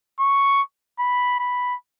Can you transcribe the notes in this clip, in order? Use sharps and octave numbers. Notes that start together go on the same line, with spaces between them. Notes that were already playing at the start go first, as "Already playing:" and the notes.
C#6
B5
B5